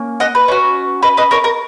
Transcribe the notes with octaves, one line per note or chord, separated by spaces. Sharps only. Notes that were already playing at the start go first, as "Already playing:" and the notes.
Already playing: A#3 C#4
D#5 F#5
B4
C#4 F#4
B4 D#5
B4 D#5
A#4 C#5
A#4